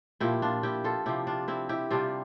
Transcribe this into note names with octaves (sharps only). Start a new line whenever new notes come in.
A#2 F3 E4 G4
D4 F4
E4 G4
F4 A4
C3 F3 E4 G4
D4 F4
C4 E4
E4 G4
C3 G3 D4 F4